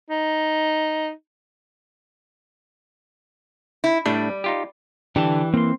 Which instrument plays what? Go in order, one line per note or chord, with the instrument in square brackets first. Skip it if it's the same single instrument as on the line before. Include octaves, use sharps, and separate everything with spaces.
[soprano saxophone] D#4
[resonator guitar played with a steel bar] E4
[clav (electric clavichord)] A2 A3 D4 [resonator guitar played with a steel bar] G3
[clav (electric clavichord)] D#4 F4 G4
[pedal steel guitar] D3 A5 [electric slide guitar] E3 [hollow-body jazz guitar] D4 G4
[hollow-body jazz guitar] A#3 [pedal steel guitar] C4 C6